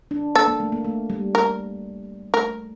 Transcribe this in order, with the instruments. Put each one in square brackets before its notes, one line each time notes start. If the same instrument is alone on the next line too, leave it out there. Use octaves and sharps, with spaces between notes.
[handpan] D4
[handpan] A#3 [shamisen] A4
[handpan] A#3
A3
A#3
A3
G3
[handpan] G3 [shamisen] A#4
[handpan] A3 [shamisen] A#4